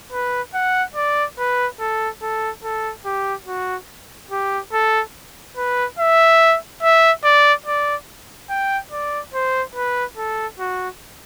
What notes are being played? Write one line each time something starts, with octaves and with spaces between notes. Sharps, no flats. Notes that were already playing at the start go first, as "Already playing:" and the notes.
B4
F#5
D5
B4
A4
A4
A4
G4
F#4
G4
A4
B4
E5
E5
D5
D5
G5
D5
C5
B4
A4
F#4